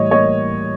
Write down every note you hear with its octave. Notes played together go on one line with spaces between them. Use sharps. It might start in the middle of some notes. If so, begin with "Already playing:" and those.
Already playing: A2 E3 G3 C#5 D#5
A#3 C#5 D#5